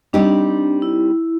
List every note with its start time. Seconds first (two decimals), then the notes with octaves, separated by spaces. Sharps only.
0.13 G3 C4 D4 D#4 G4
0.82 E4